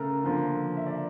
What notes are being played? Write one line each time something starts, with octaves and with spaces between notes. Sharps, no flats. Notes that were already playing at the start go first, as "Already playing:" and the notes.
Already playing: C#3 A3 A4 A#4
D3 F3 A#3
E5
D5